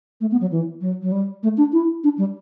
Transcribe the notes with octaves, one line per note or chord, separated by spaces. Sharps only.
A3
B3
F#3
E3
F#3
F#3
G3
A3
D4
E4
D4
G3